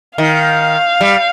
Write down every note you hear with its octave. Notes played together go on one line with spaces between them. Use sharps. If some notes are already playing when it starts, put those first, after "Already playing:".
D#3 F5
G3